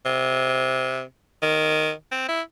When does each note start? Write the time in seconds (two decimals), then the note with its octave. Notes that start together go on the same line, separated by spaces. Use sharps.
0.06 C3
1.43 D#3
2.12 C4
2.29 E4